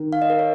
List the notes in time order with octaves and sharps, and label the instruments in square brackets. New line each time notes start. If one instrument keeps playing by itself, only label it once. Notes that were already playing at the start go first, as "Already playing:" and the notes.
Already playing: [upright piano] D#3
[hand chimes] F5
D#5
A#4
C#5